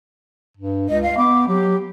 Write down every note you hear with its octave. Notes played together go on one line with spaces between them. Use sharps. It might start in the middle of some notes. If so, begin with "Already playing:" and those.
G2
C#2 D#5
F5
B3 D6
F#3 G4